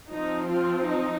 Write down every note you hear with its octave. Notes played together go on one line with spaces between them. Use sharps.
F3 C4 D#4
F4
D#4